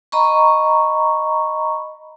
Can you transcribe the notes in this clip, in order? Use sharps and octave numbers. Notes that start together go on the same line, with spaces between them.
D#5 A#5 B5 C#6